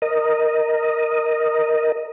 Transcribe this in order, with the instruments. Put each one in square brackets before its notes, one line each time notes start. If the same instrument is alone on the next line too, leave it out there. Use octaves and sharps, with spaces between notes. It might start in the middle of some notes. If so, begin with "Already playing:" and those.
[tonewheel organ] A#4 D#5